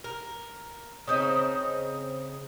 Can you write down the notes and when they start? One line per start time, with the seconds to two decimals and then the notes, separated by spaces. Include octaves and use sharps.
0.04 A#4
1.07 C#3 C4 D#4